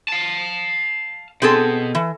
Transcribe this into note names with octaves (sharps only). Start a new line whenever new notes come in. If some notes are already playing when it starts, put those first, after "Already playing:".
F5 A5
B2 C4 G#4 A4
E3